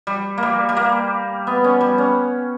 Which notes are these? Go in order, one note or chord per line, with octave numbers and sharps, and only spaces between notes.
G3
A#3
G3
G3
A#3
B3
C#4
G3
C#4